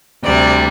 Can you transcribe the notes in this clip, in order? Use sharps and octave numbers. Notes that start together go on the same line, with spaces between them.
D2 C3 G3 D5